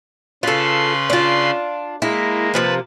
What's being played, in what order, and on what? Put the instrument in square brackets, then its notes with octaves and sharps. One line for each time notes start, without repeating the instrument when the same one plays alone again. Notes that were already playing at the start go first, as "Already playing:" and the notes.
[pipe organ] C#3 B4 C6 [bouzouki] F4 A4
[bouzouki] D4 F4
[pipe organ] G#3 A#3 [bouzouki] E4
[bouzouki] C3 F3 A#3 [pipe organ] B4 A5